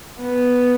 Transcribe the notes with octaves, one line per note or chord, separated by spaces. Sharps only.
B3